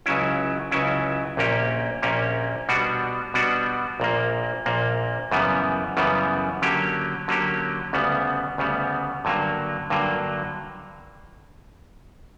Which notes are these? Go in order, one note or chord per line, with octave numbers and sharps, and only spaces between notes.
C#2 C#3 F#3 C#4 E4
C#2 C#3 F#3 C#4 E4
A#1 A#2 A#3 C#4 G4
A#1 A#2 A#3 C#4 G4
B2 G3 B3 D4 F#4
B2 G3 B3 D4 F#4
A#1 A#2 A#3
A#1 A#2 A#3
F#2 C#3 E3 G3 B3
F#2 C#3 E3 G3 B3
D3 F#3 A#3 C#4 G4
D3 F#3 A#3 C#4 G4
D2 C#3 G3 B3
D2 C#3 G3 B3
G2 D3 F#3 A#3
G2 D3 F#3 A#3